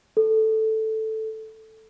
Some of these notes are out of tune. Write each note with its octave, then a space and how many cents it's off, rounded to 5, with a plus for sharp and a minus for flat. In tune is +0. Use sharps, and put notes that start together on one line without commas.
A4 +0